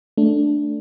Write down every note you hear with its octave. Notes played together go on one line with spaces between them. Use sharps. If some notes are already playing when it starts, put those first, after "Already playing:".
A3 D4